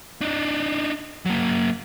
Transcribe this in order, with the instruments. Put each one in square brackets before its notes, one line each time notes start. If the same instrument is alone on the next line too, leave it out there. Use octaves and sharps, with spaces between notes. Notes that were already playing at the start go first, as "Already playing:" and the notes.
[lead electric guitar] D4 D#4
F#3 A#3